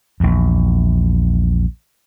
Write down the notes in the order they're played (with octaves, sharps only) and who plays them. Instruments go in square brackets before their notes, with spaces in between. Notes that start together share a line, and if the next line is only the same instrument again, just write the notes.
[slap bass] A#1 E2